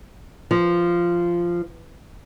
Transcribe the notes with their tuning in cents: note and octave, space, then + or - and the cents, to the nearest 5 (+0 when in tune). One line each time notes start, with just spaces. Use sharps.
F3 -10